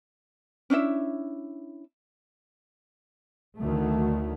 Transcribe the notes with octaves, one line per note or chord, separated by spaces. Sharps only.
C#4 D4 E4 E5
D2 D3 D#3 F#3 A3